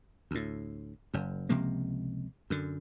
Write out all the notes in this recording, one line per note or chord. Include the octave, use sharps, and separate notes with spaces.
D2 A2
F#1 F#2
C#2 C3 F3 A#3
F#2 D3